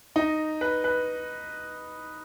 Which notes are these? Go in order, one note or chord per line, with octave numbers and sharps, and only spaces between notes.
D#4
B4
B4